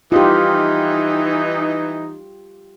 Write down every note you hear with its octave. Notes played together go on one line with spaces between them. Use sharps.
E3 D#4 F4 G4